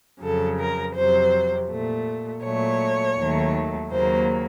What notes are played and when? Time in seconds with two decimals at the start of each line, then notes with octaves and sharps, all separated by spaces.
0.21 F2 C#3 F#3 A4
0.59 A#4
0.95 F2 C3 F#3 C5
1.70 A#2 A3
2.43 A#2 F#3 A3 C#5
3.17 D#2 D#3 F#3 A3
3.91 D#2 C#3 F#3 A#3 C5